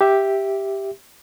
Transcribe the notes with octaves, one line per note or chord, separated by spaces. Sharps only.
G4 E5